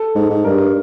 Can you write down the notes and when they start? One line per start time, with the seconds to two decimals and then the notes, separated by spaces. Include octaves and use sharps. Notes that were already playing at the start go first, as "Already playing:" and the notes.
Already playing: A4
0.15 G#2
0.30 G#2
0.44 G2 A#4